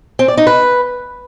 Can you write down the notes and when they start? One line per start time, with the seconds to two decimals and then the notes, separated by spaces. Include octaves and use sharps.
0.19 C4
0.28 D5
0.37 D#4
0.47 B4